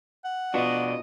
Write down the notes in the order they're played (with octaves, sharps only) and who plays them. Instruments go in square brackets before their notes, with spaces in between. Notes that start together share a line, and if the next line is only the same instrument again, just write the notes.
[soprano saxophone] F#5
[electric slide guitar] B2 D4 [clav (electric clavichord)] B3 F4 F#4 [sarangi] D#5